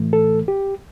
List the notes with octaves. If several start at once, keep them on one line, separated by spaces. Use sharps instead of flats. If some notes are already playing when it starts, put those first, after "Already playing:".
Already playing: A2 E3 A3
A4
G4